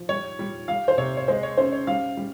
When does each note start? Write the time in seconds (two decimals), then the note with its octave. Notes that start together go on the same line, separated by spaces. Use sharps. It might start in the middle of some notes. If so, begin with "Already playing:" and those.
Already playing: F3
0.09 G3 C#5
0.39 G3
0.68 G3 F5
0.88 C5
0.98 C3 C#5
1.17 C#5
1.28 G#3 C5
1.43 C#5
1.57 C#4 C5
1.72 C#5
1.87 G3 F5
2.17 G3